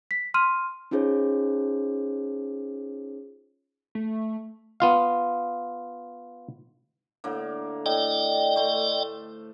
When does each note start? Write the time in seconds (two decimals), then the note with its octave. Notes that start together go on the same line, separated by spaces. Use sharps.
0.11 B6
0.34 C6 F6 D#7
0.91 C#4 D#4 F4 G#4 C5 C#5
3.95 A3
4.80 B3 F4 F5
7.24 A2 D3 A#3
7.86 A2 D5 D#5 G5
8.56 A3 C5